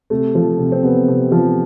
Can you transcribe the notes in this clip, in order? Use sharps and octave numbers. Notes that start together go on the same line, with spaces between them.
C3 A3
F3
C3
C4
C3 B3
C3
F3